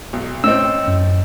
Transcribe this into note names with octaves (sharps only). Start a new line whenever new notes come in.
B1
A2 C4 C#4 D#5 E6
F#2